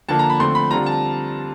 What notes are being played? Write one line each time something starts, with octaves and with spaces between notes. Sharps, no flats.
D3 F3 A#3 A5
A#5
B5
D3 F3 A3 C4 C6
B5
D3 G3 C4 F4 A#5
A5